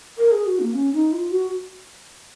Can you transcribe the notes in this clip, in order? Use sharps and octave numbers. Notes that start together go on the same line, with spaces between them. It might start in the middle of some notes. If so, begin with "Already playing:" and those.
A#4
G#4
F#4
A#3
C#4
D#4
F4
F#4